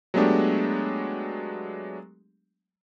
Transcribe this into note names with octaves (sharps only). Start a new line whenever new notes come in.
F#3 G#3 A3 B3 D4 G4